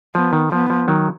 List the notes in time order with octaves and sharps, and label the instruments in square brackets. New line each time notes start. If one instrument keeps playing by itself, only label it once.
[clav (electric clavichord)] F3 [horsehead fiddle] B3
[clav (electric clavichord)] D#3
[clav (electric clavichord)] F3 [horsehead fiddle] B3
[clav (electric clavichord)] F3
D#3 F#3